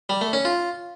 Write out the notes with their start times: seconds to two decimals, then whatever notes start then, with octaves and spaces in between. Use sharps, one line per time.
0.09 G3
0.21 A3
0.33 C#4
0.45 F4